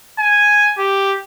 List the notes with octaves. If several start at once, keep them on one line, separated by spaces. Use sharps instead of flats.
G#5
G4